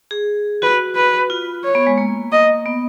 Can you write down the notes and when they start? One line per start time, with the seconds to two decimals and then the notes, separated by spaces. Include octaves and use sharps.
0.11 G#4
0.62 F#4 B4
0.95 B4
1.30 F4
1.64 C#5
1.75 B3
1.87 G#3
1.98 A#3
2.32 D#5
2.66 B3